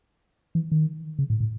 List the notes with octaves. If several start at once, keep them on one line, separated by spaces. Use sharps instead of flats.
E3
D#3
C#3
A2
A2